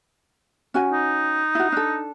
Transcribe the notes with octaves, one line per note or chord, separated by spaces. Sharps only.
C#4 F#4 G#5
D#4
E4 F#4
D4 A4